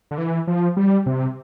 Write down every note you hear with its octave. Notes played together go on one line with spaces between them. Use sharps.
D3
E3
F3
G3
C3